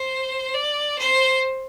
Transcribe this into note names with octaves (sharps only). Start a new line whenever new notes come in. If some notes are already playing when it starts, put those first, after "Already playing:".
Already playing: C5
D5
C5